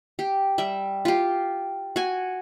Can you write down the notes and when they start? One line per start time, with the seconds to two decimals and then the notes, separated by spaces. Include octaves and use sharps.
0.19 G4
0.58 G3 E5
1.05 F4 G4
1.96 F#4 G#5